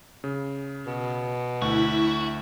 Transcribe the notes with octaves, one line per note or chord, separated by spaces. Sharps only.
C#3
B2
D2 E4 F#4 E5